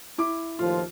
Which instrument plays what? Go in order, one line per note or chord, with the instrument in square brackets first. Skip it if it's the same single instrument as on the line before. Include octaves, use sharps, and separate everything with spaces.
[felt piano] E4 D6
[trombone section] D#2 A2 F3 [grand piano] F4